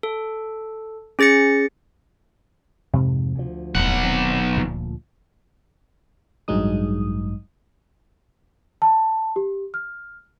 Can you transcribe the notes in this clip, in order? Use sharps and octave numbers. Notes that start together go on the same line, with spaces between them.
A4
C#4 G#4 A6 A#6 C#7
F2 G#2 C3
D2 F3
D#1 B1 F2 A2 G3 F#5
D#3 C4
D2 A#2 F3
A1 G2 F#3 G#3 D#4 D#6
A5
G4
F6